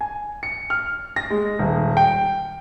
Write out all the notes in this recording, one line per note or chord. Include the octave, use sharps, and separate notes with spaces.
G#5
C#7
F6
A#6
G#3
D#1
G5